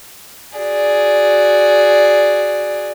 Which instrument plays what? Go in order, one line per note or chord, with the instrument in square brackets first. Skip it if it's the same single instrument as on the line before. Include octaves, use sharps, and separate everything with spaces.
[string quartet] F#4 G#4 D5